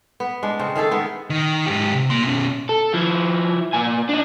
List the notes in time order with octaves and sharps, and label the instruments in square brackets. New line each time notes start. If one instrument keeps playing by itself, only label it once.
[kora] B3
G#3 D4
C#3 C4
D#3 A3 G#4 A4
D#3 G#3 B3
[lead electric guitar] D#3
G#2 G4
C3
A#3 C6
B2 C#4
[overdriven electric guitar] A4
F3 E4
A#2 G#5
D4 D#4